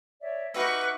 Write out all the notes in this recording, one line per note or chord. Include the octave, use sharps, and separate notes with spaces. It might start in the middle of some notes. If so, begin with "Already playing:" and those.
C#5 D5 E5
D#4 F#4 B4 E5 C#6 D6 F6 F#6